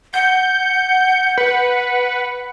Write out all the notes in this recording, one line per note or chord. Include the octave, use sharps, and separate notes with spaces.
F#5 G6
B4